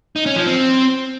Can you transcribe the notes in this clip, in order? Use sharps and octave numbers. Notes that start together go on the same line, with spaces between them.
D#4
C#4
F3
C4